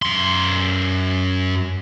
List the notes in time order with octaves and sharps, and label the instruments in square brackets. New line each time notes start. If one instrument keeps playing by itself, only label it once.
[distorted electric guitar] F#2 C6